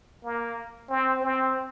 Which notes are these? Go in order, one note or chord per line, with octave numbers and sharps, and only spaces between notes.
A#3
C4
C4